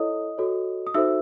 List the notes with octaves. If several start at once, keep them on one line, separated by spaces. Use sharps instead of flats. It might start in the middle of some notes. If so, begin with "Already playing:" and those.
Already playing: E4 A4 C#5 D#5 D#6
F#4 A4 C#5
D#6
D#4 F#4 A4 C5 E5 E6